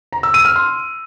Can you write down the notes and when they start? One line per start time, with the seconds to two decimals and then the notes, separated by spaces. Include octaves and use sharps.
0.13 A#5
0.23 E6
0.34 D#7
0.45 F6
0.56 C6